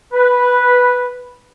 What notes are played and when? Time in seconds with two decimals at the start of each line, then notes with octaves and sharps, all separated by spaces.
0.13 B4